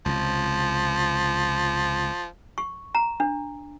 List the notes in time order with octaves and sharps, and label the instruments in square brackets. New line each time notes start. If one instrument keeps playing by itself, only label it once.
[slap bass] C#2 C3 [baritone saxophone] F3
[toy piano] C#6
A#5
D4